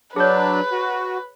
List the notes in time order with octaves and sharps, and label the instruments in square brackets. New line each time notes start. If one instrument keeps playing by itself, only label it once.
[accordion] F#3 D4 [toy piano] G#4 C#5 [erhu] B4
[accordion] F#4